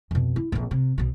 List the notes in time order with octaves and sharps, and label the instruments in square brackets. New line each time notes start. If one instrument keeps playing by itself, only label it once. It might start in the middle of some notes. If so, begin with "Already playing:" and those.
[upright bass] F2 B2
E4
A#1 F2
C3
B1 B2